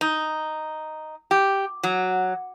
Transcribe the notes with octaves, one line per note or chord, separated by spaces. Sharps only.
D#4
G4
F#3